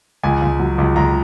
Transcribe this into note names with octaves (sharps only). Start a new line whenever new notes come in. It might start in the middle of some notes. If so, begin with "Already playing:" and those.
C#2 G#5
C#2
F#3
C#2
C#2 A#5